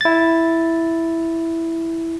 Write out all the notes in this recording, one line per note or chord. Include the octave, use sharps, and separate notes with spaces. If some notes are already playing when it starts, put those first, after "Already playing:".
E4 A6